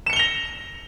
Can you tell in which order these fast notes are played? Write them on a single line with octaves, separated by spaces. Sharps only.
E7 C#7 G7 F7 A#6